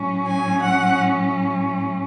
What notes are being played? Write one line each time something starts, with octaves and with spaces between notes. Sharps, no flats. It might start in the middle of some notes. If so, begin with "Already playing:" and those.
Already playing: A2 F#3 C#4
G#5
F#5